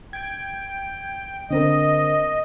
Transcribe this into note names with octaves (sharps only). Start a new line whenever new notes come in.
G5 G#6
D3 C4 A#4 D#5